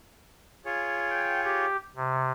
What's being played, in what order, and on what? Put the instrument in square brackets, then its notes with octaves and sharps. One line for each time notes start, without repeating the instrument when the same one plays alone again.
[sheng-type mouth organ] F4 G#4 C#5
[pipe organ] G5
G4
C3